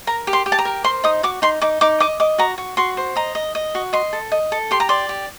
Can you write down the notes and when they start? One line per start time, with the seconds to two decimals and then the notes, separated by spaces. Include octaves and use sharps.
0.07 A#4 A#5
0.27 G4
0.33 C6
0.46 G4
0.52 A5
0.59 A#5
0.65 A#4
0.84 C5 C6
1.04 D#4 D#6
1.23 F#4 D6
1.42 D#4 C6
1.62 D#4 D6
1.81 D#4 D6
2.00 D#5 D6
2.20 D#5 D6
2.38 F#4 A#5
2.58 F#4
2.77 F#4 C6
2.97 C5
3.16 D#5 A#5
3.35 D#5
3.55 D#5
3.75 F#4
3.93 D#5 C6
4.13 A4
4.32 D#5
4.52 A4
4.71 G4 C6
4.80 A#5
4.89 D5 C6
5.09 G4